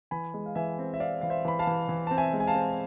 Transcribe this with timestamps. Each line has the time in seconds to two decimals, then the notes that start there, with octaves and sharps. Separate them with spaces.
0.11 E3 G#5 B5
0.34 G#3
0.46 F5
0.55 E3 E5 G#5
0.79 C4
0.94 E5
1.00 C4 D5 F5
1.21 E3 F5
1.30 C5 E5
1.45 E3 B5
1.59 F5 A5
1.67 E3
1.89 E3
2.07 C4 A5
2.18 E5 G#5
2.33 G#3
2.40 G#5
2.47 F5 A5
2.55 C4